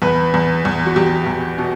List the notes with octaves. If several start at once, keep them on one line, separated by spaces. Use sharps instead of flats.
E2 B4
E2
E2
F#4
E2 G4
E2
B2